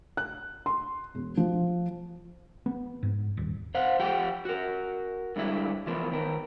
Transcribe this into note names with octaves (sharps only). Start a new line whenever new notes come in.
F#6
C6
E1
F3
B3
G#2
D#1
C5 F5 F#5
F3 F4 G4 F#5 G5
F#4 A#4
G2 D3 G#3 E4
E3 F3 A#3 B3
D#3 B3 A#4